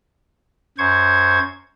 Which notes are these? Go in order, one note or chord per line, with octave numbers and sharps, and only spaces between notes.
F#2 C5 C#6 G#6